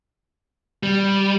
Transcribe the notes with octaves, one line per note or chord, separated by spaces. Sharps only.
G3